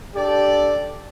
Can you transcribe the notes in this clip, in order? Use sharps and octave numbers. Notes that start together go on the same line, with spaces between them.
D4 G4 A4 D5